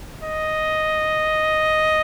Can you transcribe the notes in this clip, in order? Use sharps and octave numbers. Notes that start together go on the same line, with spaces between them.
D#5